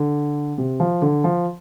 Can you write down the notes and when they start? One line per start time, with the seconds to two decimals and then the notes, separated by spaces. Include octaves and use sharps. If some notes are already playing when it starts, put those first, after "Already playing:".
Already playing: D3
0.58 C3
0.80 F3
1.02 D3
1.24 F3